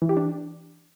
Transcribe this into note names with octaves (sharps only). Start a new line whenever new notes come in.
E3
G4
D4